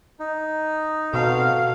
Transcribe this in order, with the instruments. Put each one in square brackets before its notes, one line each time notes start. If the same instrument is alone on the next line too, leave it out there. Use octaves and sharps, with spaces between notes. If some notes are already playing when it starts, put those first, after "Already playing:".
[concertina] D#4
[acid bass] B2 [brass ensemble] C4 F#4 A4 [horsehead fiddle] F5